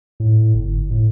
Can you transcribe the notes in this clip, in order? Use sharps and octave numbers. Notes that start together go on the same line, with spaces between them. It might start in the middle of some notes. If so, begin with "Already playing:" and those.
A2
G1
A2